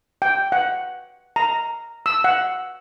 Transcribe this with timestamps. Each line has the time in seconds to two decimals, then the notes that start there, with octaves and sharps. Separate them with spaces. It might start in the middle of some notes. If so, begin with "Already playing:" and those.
0.22 G5
0.52 F#5
1.36 A#5
2.06 E6
2.24 F#5